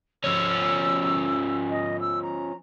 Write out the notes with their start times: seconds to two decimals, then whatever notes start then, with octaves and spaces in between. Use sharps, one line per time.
0.24 F3 C#4 E6
1.70 D#5
2.01 E6
2.22 A#5